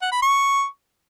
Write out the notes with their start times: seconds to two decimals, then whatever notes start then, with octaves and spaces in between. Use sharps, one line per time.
0.02 F#5
0.12 B5
0.22 C#6